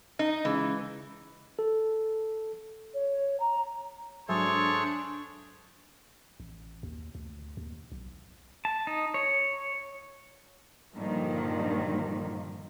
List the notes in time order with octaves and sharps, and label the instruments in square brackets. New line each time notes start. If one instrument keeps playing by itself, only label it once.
[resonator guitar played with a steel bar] D#4
[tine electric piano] C#3 G#3 [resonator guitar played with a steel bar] E3
[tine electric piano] A4
[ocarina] C#5
A#5
[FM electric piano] G#2 F#3 E5 [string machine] D4 [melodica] G#4 A4 C5 [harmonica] C#5
[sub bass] A1
D#2
D2
D#2
B1
[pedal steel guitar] A5
D#4
C#5
[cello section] G2 A#2 D3 D#3 F3